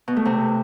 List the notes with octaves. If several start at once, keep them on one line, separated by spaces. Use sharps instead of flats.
B2
A3
C3